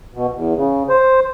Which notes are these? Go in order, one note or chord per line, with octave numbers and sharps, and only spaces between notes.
B2
E2
C#3
C5